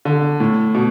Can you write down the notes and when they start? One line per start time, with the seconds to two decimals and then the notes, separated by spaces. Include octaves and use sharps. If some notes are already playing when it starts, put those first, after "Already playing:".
0.05 D3
0.40 A2
0.75 B2